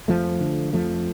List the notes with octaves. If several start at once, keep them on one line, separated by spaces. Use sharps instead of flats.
F2 F3 A3
D3
F2 F3 A3